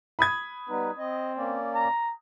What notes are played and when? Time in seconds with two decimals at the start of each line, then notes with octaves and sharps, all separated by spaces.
0.19 B5 D#6 G#6
0.69 G3 B3 D#4 B4
0.98 C4 D#5
1.37 A#3 C#4 D5
1.75 A#5